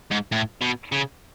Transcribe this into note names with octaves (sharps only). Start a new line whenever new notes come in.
G#2
A2
B2
C#3